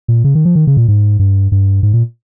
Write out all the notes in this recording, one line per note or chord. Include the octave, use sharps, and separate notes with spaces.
A#2
C#3
D#3
F3
D#3
C#3
A#2
G#2
G2
G2
G#2
A#2